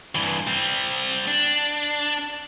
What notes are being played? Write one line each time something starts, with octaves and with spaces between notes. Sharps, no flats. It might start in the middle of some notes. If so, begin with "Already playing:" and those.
G2 E3
G3 C4
D4